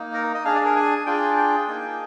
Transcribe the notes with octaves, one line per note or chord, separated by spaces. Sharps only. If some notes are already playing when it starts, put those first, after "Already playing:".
Already playing: A#3 D#4
A#4
D#5
D4 G#4 F5
D5
A#4
G#5
D4 F4 G#4 G5
G5
A#3 D#4 G#4